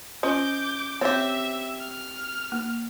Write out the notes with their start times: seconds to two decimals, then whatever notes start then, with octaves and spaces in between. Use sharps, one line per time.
0.23 C#4 F4 C5 D#5 D6 G6
1.01 C4 G4 C#5 E5
1.80 F6
2.52 A#3